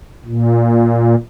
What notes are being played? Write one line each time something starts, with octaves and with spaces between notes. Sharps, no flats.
A#2